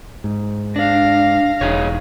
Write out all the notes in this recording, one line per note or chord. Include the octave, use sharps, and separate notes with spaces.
G#2
D4 F5 A#6
E1 D#4 G#4 C#5